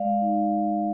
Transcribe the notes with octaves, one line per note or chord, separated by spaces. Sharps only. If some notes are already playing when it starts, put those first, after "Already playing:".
Already playing: G#3 D5 F5
D#4